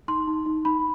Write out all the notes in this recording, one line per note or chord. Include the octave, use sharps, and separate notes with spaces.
D#4 C6
D#4
D#4
D#4 B5